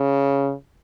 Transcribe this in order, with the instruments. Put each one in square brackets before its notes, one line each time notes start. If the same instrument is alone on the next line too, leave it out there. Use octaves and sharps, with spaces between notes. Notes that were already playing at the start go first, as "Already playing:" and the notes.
Already playing: [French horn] C#3